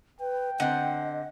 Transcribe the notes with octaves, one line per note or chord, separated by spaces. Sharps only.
B4 G5
D3 C4 D#5 F#5